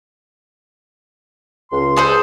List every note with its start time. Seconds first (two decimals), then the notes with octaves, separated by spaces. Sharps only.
1.72 C#2 C6
1.97 G#4 A4 C5